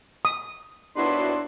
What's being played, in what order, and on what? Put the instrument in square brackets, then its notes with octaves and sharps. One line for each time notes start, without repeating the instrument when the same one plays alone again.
[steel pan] D#6
[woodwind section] D#2 B3 C6 [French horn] D4 [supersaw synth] E4 F#4 B4